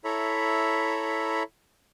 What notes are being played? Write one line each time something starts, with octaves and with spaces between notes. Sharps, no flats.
E4 A4 C#5 E5 A#5 B5